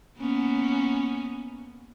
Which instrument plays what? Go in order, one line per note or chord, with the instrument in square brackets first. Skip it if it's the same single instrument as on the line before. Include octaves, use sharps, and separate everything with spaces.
[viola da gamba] A#3 B3 C#4